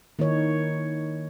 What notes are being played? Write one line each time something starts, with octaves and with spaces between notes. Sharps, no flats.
D#3 A#3 D#4 E4 A#4 C#5